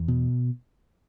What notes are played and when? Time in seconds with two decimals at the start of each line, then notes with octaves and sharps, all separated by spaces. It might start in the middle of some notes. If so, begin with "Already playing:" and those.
Already playing: E2
0.08 B2